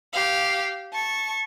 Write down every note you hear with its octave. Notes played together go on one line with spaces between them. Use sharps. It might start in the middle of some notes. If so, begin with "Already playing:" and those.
G4 F5
A5 C#6